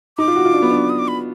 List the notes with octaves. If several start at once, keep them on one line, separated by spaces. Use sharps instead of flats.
D#4 D6
F4
F#4
F4
D4
B3
D4
D#6
D6
B5